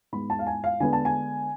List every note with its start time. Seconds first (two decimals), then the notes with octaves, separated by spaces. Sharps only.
0.12 G#2 G#3 B3 B5
0.30 A5
0.39 F5
0.47 G#5
0.64 F5
0.80 D3 G#3 B3 D4 G#5
0.93 A5
1.05 G#5